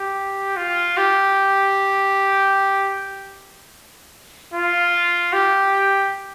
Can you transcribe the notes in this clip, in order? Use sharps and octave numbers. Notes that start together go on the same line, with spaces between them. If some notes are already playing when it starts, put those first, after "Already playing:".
Already playing: G4
F4
G4
F4
G4